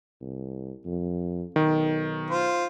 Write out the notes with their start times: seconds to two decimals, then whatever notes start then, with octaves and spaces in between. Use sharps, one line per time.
0.21 C2
0.85 F2
1.56 B1 D#3
2.31 F4 C5